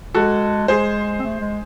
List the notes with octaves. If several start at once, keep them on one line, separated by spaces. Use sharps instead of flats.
G#3 F#4 A4
G#3 G#4 C5
C4
A3
G#3